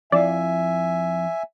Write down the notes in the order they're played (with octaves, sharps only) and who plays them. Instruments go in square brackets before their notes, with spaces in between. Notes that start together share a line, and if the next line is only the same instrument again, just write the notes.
[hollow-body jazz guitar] F2 E4 F5 [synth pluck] D5 [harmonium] E5 G#5